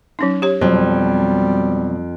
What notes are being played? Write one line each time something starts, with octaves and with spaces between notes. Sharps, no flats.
F#3 C#4 D#4
G4 C#5
F2 B2 F#3 G3